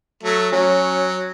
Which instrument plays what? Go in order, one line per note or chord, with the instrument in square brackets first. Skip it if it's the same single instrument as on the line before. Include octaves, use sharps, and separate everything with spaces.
[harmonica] F#3 A3
[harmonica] F#3 [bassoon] C#4